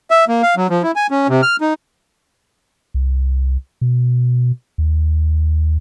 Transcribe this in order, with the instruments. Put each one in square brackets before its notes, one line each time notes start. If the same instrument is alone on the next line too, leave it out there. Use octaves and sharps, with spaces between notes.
[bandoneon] E5
A#3
F5
F#3
F3
E4
G#5
C#4
C3
F6
D#4
[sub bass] C2
B2
D#2